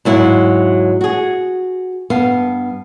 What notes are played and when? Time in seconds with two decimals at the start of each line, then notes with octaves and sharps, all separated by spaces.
0.05 G#2 F#3 E4 F4
1.01 F#4 G#4
2.10 G2 B3 F5